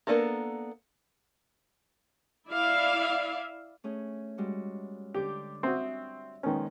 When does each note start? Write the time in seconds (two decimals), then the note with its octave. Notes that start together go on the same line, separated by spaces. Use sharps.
0.07 A#3 B3 D4 A4 A#4
2.49 E4 D5 E5 F5
3.84 A3 C#4 G#4
4.38 G3 G#3 F#4
5.14 D3 G4 D6 G6
5.63 C4 F#4 E5 D#6
6.43 F2 A#2 D#3 G#3 B3 C#4